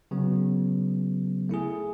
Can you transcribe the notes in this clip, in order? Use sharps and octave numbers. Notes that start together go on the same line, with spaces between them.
C#3 F#3 B3
A3 E4 G#4